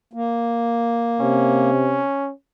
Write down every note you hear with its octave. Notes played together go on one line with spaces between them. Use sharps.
A#3
C3 C#4